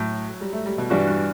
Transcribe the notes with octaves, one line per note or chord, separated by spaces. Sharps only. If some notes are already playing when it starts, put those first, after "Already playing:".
Already playing: A2 F#3
G3
A3
G3
B2
G2 E3 G3 D4 F#4
G2